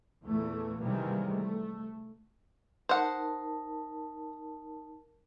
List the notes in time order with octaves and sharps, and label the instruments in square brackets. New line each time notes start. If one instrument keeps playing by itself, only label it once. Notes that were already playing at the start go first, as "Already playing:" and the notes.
[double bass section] E2 A#2 E3 A3
C3 D#3 E3 G3 G#3 A#3
A3
[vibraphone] D#4 A#4 A5 [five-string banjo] C5 F#5